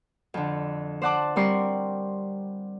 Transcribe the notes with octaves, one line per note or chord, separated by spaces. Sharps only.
F2 D3
C5 D5 F#5 A5 D6
G3 C4 A#4 D5 C6 C#6